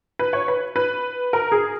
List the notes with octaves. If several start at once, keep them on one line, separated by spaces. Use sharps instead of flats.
B4
C#5
B4
B4
A#4
G#4